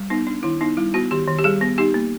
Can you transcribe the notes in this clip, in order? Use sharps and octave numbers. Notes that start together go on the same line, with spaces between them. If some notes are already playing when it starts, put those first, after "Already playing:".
Already playing: G3
B3 D#4
D4
D#3 E4
B3 D#4
G3 E4
B3 F#4
D#3 G4
D#3
G4
G3 G#4
B3
D#4 G4
A#3